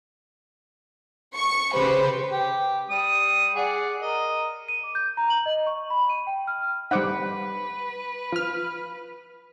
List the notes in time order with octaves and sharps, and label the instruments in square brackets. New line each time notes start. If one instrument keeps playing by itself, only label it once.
[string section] C#6 C#7
C#3 G4 B4 C5
[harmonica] G4
G3 D#6
G#4 D5 F#5
A#4 D#5
[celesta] D#7
D6
G6
A#5
F#7
D#5
C#6
B5
D#7
G5
F6
[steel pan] G3 F#5 [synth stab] D#4 C5 D6 [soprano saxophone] B4
[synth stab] F3 F6